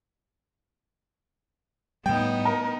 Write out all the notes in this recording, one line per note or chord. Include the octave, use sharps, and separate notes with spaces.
A2 G3 B3 D#4 G5
A#4